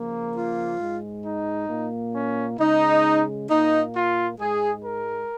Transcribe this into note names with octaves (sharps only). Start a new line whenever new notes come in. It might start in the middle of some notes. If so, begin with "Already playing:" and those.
Already playing: C#3 F3 A#3
F4
G#2 G#3
D#4
A#2 A#3
C#4
C#3 G#3 D#4
A#2 A#3 D#4
F4
G#2 G#3 G#4
A#4